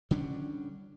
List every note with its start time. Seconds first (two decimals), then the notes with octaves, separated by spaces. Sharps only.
0.11 D3 G3 C#4 D4